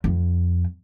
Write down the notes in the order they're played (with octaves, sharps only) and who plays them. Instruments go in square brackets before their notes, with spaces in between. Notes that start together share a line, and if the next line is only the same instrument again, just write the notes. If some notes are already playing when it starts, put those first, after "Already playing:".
[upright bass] F2